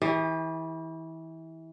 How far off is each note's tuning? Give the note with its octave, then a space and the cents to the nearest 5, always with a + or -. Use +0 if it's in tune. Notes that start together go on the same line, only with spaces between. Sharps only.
E3 -25 G4 +35